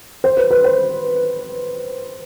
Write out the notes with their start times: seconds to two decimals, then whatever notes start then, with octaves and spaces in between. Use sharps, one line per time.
0.24 C5
0.37 B4
0.51 B4
0.64 C5